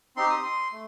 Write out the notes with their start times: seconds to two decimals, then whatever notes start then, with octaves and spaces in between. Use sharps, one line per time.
0.17 C4 D#4 G4 C6
0.30 D#6
0.43 C6
0.72 A3